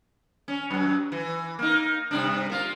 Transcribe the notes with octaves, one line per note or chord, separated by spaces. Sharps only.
C#4
F#2 F#3
E3
A#3 D#4
G2 C3 D4
A#3 F4